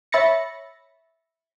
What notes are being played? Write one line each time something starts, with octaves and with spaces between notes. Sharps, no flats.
C#5 E5 B5 A6 A#6 C#7